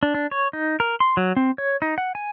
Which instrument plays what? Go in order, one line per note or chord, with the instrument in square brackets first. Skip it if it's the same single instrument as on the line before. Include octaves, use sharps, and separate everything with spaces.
[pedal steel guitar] D4
D4
C#5
D#4
A#4
C6
F#3
C4
C#5
D#4
F#5
G#5